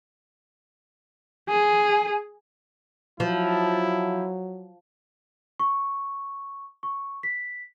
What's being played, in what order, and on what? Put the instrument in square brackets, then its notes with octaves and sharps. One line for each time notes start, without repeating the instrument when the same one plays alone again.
[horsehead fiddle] G#4 [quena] G#5
[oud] F3 [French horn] F#3 [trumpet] E4
[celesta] C#6
C#6
B6